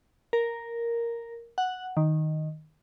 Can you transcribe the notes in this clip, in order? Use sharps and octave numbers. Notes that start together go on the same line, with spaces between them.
A#4
F#5
D#3